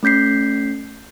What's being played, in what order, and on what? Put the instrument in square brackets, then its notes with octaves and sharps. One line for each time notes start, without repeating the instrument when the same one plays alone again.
[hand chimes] A3 C#4 G6 B6 C7